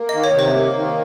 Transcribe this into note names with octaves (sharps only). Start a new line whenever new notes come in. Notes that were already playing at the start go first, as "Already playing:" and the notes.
Already playing: A#3
D#3 D#5
C#5
C3 C5
A#3
D#3